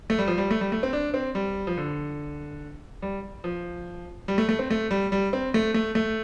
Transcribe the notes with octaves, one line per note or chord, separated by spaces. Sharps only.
A3
G3
F3
G3
A3
G3
A3
C4
D4
C4
G3
F3
D3
G3
F3
G3
A3
A3
C4
A3
G3
G3
C4
A3
A3
A3